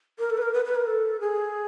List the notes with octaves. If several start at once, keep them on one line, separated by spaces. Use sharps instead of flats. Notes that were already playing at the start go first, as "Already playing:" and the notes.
A#4
A4
B4
A#4
B4
B4
A#4
A4
G#4